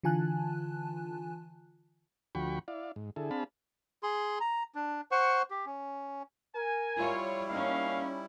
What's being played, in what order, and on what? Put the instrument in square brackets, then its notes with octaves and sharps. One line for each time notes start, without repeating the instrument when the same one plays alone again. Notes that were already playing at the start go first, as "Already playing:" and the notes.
[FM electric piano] D3 E3 F4 G#5 A5 F#6
[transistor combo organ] D2 F3 F#4 G5 B5 C#6
E4 D5 F5
G#2
D3 E4 G#4 A4
C4 D4 G#4 F5 A5 B5
[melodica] G#4 C6
A#5
D4
C5 F#5 C#6
G4
C#4
[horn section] A#4 G#5
[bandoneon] G3 E4 [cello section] F4 C#5
[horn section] A#3 F5 [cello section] C#4 D#4